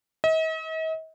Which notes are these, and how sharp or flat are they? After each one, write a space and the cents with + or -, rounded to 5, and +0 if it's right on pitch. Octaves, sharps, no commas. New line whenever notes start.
D#5 +45